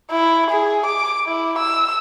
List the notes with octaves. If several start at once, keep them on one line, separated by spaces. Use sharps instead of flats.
E4
G#4
D6
E4
E6